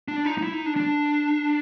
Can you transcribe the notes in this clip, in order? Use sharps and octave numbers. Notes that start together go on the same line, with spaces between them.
D4
D#4
D#4
E4
D#4
D4
D4